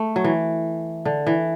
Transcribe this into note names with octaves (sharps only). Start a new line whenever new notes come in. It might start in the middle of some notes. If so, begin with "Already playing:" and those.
Already playing: A3
F#3
E3
D3
E3